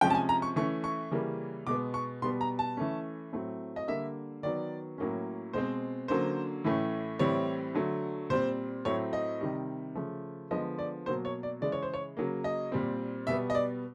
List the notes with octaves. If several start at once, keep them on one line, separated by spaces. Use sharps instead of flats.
C3 F3 G#3 C#4 G5
A5
G#5
A#5
C#6
E3 A3 C#4 C#6
C#6
C#3 E3 G3 A#3 C#4
B2 G#3 B3 D6
C#6
B2 G3 B3 C6
A#5
A5
E3 A3 C#4
A2 F#3 A3 C4
D#5
D3 G3 A#3 E5
D#3 F#3 B3 D5
A2 F#3 A#3 C#4
B2 G#3 C4 C5
D3 F#3 A#3 C#4 C5
A2 E3 A3 C#4
A2 E3 G3 C4 C#5
D3 F#3 A3
A#2 G3 C4 C5
A2 F#3 A3 C4 C#5
D#5
C3 D#3 G3
C#3 F3 A3
D3 F3 G#3 B3 D#5
D5
B2 F#3 A#3 C5
C#5
D5
C#3 E3 G#3 D5
C#5
C5
C#5
C#3 F#3 A#3
D#5
A#2 G3 C4
B2 G3 B3 E5
D#5
D5